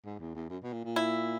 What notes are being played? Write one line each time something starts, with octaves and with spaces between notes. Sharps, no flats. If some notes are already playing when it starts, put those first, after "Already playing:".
G#2
E2
E2
F#2
B2
A#2
A#2
E4